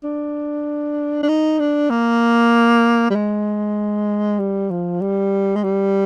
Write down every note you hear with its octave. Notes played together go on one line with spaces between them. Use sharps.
D4
D4
D#4
D4
A#3
G3
G#3
G3
F3
G3
G#3
G3